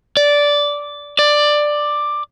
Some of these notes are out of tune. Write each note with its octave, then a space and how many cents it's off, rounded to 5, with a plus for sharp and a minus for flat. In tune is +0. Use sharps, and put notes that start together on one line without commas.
D5 -10
D5 +10